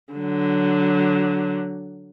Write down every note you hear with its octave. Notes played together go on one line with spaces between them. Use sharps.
D3 F#3